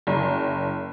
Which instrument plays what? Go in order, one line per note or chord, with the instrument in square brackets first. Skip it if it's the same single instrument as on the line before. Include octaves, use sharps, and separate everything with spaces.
[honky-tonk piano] F#1